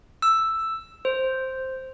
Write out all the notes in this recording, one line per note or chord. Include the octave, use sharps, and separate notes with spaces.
E6
C5